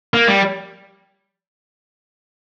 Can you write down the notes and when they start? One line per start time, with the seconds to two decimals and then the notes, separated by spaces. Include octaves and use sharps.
0.14 A#3
0.28 G3